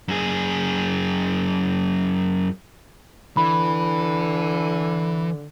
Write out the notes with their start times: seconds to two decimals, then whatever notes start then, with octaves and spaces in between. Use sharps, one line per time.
0.08 F#2 G#4
3.37 D3 E3 B5